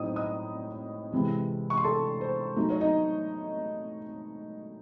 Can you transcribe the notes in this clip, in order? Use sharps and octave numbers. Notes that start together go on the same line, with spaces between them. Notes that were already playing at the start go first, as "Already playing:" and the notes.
Already playing: A2 F#3 C4 D#4 D#5 D#6
D#5 D#6
C3 E3 G#3
C#6
C6
A4 A5
C5
F#3 A3 D#4
C#5
D#4 D#5